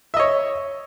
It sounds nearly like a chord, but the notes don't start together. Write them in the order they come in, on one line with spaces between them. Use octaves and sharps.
E5 D#5 C#5